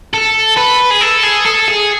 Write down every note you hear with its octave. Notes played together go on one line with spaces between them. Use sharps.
A4
B4
G#4
A4
G#4
A4
G#4